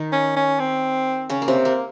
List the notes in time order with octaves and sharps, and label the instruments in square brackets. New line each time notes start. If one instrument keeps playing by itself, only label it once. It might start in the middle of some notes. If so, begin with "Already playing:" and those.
Already playing: [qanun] D#3 D#4
[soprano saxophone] C#4
C#4
C4
[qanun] C#3 C#4
A#3
C3 C4
A#3